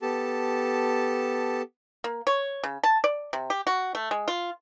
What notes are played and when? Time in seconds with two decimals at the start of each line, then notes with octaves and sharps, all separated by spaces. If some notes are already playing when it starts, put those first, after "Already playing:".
0.02 B3 G4 A4 A5
2.04 A#3
2.27 C#5
2.64 C#3
2.83 A5
3.04 D5
3.33 C3
3.50 G4
3.67 F#4
3.95 A3
4.11 G#3
4.28 F4